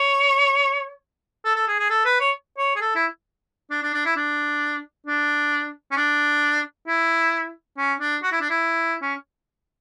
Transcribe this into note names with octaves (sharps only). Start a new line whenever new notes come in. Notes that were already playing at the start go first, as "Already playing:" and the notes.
Already playing: C#5
A4
A4
G#4
G#4
A4
B4
C#5
C#5
G#4
A4
E4
D4
D4
D4
E4
D4
D4
C#4
D4
E4
C#4
D4
F#4
E4
D4
E4
C#4